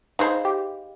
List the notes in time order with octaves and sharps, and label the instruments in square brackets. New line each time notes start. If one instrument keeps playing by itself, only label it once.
[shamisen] D#4 G#4 C5 [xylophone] D#5 F5 B5
[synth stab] G4